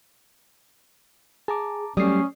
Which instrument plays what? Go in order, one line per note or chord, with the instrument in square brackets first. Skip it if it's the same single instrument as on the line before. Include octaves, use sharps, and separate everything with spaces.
[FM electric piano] G#4 [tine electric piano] A5 A#5 D6
[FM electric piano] F#3 A3 C7 [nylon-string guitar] G3 [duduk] C#4 [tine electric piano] D5 D#6